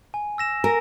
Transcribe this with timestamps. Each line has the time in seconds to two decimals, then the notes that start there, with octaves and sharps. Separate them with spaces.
0.14 G#5
0.38 E6 A#6 E7
0.64 A#4 G#5